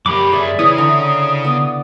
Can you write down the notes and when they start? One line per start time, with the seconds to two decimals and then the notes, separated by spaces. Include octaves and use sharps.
0.06 F#2 A#3 G4 B5 D6
0.32 G#4 D5 E5 A5
0.59 C#3 E3 C#4 E4 D#6
0.78 D3 A#5
1.45 B3 D5